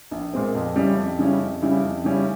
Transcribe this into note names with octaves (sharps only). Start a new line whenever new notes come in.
A#1
A#2 G#3 C4
F2
C#3 G3 C#4 E4
F2
C#3 G3 C#4 E4
F2
C#3 G3 C#4 E4
F2
C#3 G3 C#4 E4